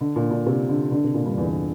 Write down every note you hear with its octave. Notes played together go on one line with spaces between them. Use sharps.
D3
A#2
A#2
C3
D3
D3
C3
A#2
G2
E2